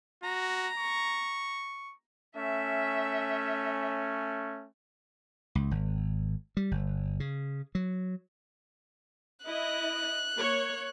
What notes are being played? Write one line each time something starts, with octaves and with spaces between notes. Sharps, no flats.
F#4 A#5
C#6
A3 C#4 E5
C#2
G#1
G3
G1
C#3
F#3
E4 D#5 F#6
A#3 C#5